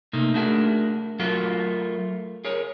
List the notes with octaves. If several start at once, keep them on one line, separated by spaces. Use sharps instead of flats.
C3 A3 A#3 D#4
A3 D4 F#4 G#4 A#4
F#3 A3 F4 F#4 A#4
G#4 A#4 C#5